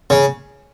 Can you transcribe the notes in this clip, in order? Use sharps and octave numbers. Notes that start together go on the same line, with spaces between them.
C#3